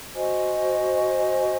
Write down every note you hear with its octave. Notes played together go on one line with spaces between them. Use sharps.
F#4 C5 D#5 G#5